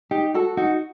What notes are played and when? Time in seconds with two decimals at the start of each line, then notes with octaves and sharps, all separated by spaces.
0.11 D#4 G4
0.34 F#4 A4
0.57 D#4 F#4